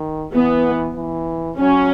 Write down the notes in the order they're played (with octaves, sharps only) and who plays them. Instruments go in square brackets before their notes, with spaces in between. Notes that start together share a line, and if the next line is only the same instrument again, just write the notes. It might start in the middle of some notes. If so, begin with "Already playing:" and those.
Already playing: [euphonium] D#3
[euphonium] E3 [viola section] B3
[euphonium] E3
[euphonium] F#3 [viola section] C#4